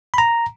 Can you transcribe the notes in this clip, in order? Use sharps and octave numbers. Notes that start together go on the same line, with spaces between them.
B5
A#5